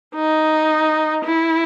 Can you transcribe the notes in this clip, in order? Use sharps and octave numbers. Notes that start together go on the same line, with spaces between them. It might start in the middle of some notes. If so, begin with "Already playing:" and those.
D#4
E4